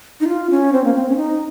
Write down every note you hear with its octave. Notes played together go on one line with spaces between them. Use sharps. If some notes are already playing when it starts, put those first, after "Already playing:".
D#4
F4
C#4
C4
A#3
C4
C#4
D#4